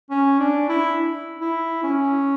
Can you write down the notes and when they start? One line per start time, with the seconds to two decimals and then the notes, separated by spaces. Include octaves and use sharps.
0.11 C#4
0.39 D4
0.69 E4
1.41 E4
1.84 C#4